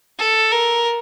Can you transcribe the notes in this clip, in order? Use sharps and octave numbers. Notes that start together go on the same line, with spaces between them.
A4
A#4